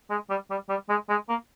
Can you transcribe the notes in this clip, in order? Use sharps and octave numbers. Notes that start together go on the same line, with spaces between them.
G#3
G3
G3
G3
G#3
G#3
A#3